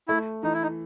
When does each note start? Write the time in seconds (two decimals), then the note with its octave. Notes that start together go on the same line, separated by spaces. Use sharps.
0.08 A3 E4
0.43 E3 D#4
0.53 E4
0.63 D#4